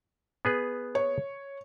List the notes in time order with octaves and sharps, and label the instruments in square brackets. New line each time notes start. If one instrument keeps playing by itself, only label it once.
[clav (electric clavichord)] B3 G#4 B4
[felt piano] C#5